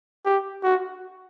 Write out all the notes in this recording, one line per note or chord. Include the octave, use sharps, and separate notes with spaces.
G4
F#4